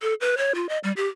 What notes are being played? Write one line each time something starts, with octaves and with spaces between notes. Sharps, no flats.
A4
B4
C#5
F4
D#5
G3
G4